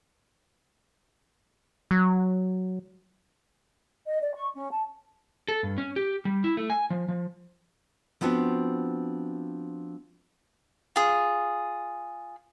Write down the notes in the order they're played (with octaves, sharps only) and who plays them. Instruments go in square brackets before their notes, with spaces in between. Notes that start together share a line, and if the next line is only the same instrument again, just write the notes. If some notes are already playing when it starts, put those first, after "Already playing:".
[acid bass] F#3
[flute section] D#5
D5
C#6
C#4
A5
[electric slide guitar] A4
G2
C#4
G4
G3
E4
A3
G#5
F3
F3
[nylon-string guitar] F3 B3 C4 D4 F#4
[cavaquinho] F4 G#4